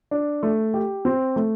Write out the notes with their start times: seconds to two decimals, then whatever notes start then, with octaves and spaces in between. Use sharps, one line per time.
0.11 D4
0.43 A3
0.74 G4
1.05 C4
1.36 A3